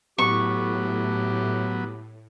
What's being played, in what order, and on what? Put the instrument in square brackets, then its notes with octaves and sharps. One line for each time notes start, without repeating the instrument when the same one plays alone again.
[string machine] A2 [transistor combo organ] F#3 B3 [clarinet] G4 [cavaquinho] C#6